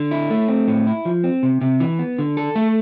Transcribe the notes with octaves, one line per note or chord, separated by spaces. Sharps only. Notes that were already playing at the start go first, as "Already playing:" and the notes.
Already playing: D3
E4
A3
C4
A2
E4
F3
C4
C3
C3
E3
B3
D3
A4
A3